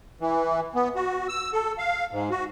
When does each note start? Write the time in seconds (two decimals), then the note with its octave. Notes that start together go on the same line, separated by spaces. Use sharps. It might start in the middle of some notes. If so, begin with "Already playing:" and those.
0.21 E3
0.75 B3
0.96 F#4
1.28 E6
1.53 A4
1.78 F5
2.11 G#2
2.30 F#4